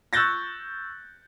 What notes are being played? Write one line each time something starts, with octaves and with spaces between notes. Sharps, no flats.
C#6 E6 F#6 G6 A6 A#6